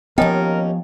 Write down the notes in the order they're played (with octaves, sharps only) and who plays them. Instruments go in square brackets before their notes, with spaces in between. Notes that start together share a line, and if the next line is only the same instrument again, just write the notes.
[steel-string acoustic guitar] D#2 C#4 [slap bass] F3 B3 [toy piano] A4 D#5 G5 [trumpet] A#4